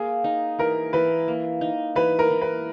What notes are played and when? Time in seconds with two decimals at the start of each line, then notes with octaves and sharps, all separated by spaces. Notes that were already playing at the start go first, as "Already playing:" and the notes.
Already playing: A#3 G#4
0.24 D#4
0.59 E3 A#4
0.93 E3 B4
1.28 A#3
1.61 D#4
1.96 E3 B4
2.19 A#4
2.30 E3
2.41 B4